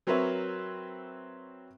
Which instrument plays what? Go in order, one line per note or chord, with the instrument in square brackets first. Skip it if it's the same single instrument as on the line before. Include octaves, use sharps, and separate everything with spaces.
[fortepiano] F#3 C4 A#4 B4 C#5 E5